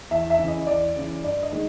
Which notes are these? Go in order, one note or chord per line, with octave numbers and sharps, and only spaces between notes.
E2 E5
E5
C#3 E3
D#5
E2 D5
C#3 E3
G2 D5
D#5
D#3 G#3